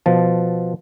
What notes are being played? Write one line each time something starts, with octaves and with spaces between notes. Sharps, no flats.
B2 F3 A5